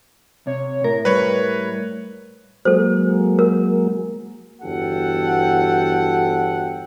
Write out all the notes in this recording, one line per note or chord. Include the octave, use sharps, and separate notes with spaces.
C3 C#5
A2 A#4
G3 B4 C#5
F#3 G#3 A#3 A4 C5
A#4
G1 E2 F#4 A4 F#5 G5